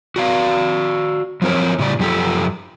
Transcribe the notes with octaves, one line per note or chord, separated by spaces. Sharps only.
F#4 D5 F5
F3 F#3 C4 A#4 C#5
A2 C#3 G4 D5
F#2 F3 G4 A4